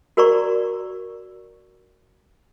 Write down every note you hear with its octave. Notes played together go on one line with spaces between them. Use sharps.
F#4 A#4 C5 D5 A#5 C#6